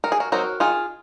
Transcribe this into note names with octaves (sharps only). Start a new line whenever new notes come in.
D#3 A#4
G#4
F#4 A#4
F#3 C4 D#4 F#4 A#4
D#3 F4 G#4